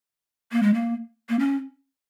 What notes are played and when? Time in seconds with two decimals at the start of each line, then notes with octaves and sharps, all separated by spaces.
0.52 A#3
0.63 G#3
0.74 A#3
1.29 A#3
1.39 C#4